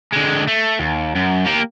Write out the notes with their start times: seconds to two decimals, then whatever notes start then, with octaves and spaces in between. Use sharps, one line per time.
0.12 D3 G#3
0.47 A3
0.79 D#2
1.16 F#2
1.47 A#3 G4